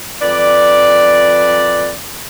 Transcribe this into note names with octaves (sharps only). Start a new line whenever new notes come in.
F2 B4 D5